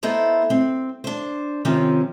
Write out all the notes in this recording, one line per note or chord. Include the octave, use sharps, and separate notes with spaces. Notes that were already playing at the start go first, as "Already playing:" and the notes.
B3 D#4 E4 A4 C5
C4
D4 C5
C3 D#3 F3 C4 C#4